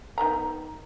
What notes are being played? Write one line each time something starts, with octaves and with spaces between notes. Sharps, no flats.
D#3 B3 A#5